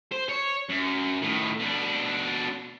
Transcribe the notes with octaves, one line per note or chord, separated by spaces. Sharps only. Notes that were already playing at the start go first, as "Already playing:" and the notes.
C5
C#5
F#2
A2 D#3
B2 D4